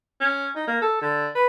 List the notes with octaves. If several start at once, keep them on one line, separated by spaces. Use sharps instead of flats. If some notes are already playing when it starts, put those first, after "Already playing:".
C#4
D#4
A#3
A4
D3
B4